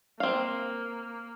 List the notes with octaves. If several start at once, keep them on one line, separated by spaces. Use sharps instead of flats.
A#3 C4 F5